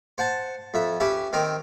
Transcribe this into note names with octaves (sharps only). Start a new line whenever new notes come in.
C5 F#5 A5
F2 E5
C#4 G4 B4 E5
D#3 C4 A#4